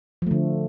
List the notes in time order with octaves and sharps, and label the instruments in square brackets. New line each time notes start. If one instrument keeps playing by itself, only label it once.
[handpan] F3
A3
D3